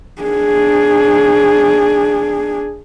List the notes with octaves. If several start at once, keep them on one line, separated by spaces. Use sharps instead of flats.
D4 G#4